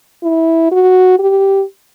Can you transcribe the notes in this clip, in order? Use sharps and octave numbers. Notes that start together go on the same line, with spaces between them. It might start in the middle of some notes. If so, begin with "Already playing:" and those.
E4
F#4
G4